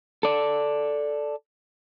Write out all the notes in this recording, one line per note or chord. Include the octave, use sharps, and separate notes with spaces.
A4 D5